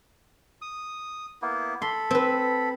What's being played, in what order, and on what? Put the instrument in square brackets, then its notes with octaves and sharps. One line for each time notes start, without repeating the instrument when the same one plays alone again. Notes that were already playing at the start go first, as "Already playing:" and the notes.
[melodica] D#6
A#3 B3 E4
[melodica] A4 B5 [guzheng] C6
[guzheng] C4 B4